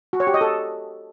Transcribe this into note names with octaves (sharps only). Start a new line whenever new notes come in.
F#4
C#5
G4
D#5
A4